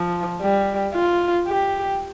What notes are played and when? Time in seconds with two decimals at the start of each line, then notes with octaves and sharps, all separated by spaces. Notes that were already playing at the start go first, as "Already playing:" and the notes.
Already playing: F3
0.41 G3
0.94 F4
1.48 G4